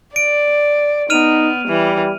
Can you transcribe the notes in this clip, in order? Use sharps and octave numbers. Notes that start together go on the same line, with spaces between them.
D5 D7
B3 D#4 F6 D#7 F7
E3 G3